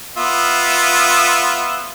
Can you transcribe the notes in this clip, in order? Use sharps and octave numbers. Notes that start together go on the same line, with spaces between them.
B3 F4 E5